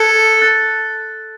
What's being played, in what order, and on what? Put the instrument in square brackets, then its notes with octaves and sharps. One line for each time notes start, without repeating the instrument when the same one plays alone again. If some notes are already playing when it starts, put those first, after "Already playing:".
Already playing: [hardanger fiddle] A4 [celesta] E6 F#6 G#6
[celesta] F#6 A6